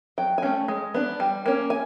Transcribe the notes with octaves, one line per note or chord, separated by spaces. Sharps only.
F#3 G5
G#5
A3 C#4 G5
G#3
B3 D4
G3
A#3 C#4
G#5